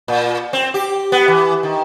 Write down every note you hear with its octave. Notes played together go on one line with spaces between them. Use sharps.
A#2
C4
G4
B3
E3
D#3